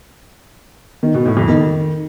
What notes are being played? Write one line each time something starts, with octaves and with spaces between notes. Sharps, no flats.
D#3
B2
A2
F2
D#3